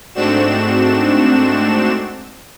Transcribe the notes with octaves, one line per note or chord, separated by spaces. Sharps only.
G#2 A3 C4 D4 F#4 E7